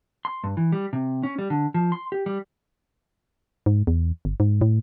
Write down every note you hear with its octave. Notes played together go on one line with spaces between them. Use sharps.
C6
G2
E3
G3
C3
C#4
G3
D3
F3
C6
G4
G3
G#2
E2
G1
G#2
A2